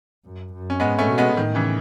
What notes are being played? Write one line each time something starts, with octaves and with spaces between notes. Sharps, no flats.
F#2
F#2
C#4
G#2 G#3 B3
A3 C#4
B2
G#3 B3
A2 D#3
C#3 E3